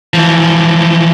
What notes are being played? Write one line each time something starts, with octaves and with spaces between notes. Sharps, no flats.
E3 F3